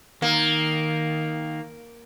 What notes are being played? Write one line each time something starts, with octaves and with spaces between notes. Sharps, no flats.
D#3 A#3